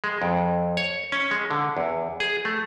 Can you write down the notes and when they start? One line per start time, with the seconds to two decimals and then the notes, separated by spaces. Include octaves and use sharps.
0.04 G#3
0.22 F2
0.77 C#5
1.12 C#4
1.31 G#3
1.51 D3
1.77 E2
2.20 G#4
2.45 A3